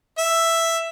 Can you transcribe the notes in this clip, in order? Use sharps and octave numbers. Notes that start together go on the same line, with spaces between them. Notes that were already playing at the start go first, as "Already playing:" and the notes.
E5